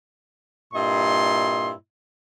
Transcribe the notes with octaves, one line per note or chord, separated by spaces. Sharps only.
G2 A#2 E4 D#5 C6